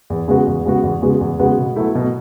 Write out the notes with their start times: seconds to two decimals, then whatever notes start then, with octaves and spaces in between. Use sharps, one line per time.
0.10 E2
0.28 C#3 G#3 B3 F#4
0.47 E2
0.66 C#3 G#3 B3 F#4
0.83 E2
1.02 C#3 G#3 B3 F#4
1.21 E2
1.39 C#3 G#3 B3 F#4
1.57 B2
1.76 F#3 A3 E4
1.95 B2